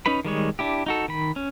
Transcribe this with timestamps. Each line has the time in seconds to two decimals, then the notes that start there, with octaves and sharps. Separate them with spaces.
0.06 C#4 D#4 B4 B5
0.25 D#3 G3 G#3 C#5
0.59 D4 E4 G4
0.86 D#4 F#4 A4
1.08 D#3 B5
1.36 C#4